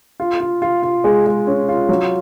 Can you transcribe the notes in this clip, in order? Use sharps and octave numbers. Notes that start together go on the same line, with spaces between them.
F4
F4
F4
F4
G#3
G#3
C#4
F4
F#3